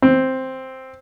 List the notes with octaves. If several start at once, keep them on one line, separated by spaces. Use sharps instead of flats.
C4